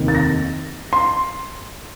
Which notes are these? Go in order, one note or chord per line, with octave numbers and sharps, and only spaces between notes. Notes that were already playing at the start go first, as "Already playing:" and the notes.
Already playing: F1 D#2 D#3
A6
A#6
C6